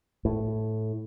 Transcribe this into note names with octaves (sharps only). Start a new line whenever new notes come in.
A2